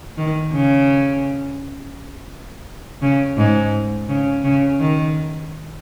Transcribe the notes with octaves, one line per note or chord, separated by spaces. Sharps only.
D#3
C#3
C#3
G#2
C#3
C#3
D#3